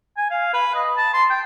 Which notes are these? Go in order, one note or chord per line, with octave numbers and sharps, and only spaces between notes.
G#5
F5
B4
D#5
A5
C6
G5